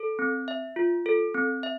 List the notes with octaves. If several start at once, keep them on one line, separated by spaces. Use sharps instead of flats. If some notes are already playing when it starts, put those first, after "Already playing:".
Already playing: A4
C4
E5
F4
A4
C4
E5